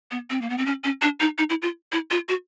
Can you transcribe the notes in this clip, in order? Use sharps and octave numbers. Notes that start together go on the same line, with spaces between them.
B3
C4
A#3
B3
C4
C#4
C#4
D4
D#4
D#4
E4
F4
E4
F4
F#4